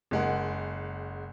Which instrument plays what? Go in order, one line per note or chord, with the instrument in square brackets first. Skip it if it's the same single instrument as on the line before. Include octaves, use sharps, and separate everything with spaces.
[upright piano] F#1 G#3 F#5